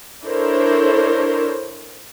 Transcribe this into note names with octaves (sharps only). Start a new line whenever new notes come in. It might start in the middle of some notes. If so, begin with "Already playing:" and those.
D4 E4 A4 A#4 C5 C#5